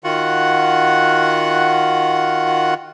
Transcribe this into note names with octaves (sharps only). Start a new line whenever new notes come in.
D#3 F4 F#4 F#5